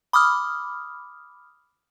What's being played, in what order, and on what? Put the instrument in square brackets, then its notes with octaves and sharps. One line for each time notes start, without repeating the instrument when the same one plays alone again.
[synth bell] B5 D6 D#6 F6